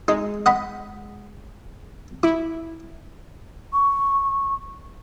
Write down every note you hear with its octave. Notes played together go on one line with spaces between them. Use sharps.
G#3 D#4
D#5 F#5 B5
E4 D6
C#6